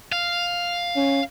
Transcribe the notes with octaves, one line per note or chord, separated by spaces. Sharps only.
F5
C#4